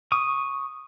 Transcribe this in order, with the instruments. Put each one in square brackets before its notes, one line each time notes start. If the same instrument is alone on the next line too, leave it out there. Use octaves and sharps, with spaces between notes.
[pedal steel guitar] C#6 D#6